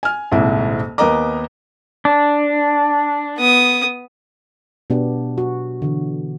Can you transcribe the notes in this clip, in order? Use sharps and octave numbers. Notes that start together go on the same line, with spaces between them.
G#5 F6
D#1 C2 G#2 E4
D#2 B3 A#4 D#5 A#5 D6
D4
B3 D#6
B2 B3 D4 G4
F#4
D3 E3